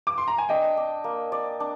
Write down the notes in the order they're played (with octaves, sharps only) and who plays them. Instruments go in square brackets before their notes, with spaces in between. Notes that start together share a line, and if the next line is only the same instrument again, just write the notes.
[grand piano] D6
C6
A#5
G#5
[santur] D4 [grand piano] D#5 G5
[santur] D4
A#3
D5
D4